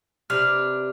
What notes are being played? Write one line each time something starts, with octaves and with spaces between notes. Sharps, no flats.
C3 D4 B4 F6